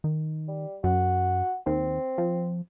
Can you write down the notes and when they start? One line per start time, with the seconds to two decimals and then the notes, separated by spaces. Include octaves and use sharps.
0.04 D#3
0.48 G3
0.84 F#2 F#4
1.66 D#2 C4
2.18 F3